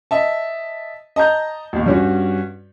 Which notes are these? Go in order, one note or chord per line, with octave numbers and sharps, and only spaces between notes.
D#5 E5 A5
D#5 A5 A#5 G6
A1 D#2
G2 C#4 F#4